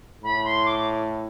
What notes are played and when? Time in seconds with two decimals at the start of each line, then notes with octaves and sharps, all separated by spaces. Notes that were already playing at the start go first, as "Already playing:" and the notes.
0.24 A2 B5
0.45 C6
0.66 D6